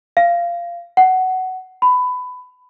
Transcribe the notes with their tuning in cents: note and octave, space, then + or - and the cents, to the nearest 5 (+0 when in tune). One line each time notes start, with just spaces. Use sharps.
F5 -15
F#5 +15
B5 +20